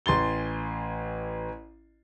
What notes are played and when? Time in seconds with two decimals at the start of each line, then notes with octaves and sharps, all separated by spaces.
0.06 A1 C6 A6 G7